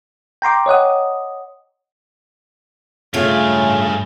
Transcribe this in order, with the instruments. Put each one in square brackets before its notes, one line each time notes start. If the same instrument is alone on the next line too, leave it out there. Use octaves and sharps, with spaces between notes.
[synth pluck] G5 A#5 C6 D6
C#5 D#5 F#5 D#6
[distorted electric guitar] G2 F5 [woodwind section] C#3 [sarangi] A3 [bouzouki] F4 G#4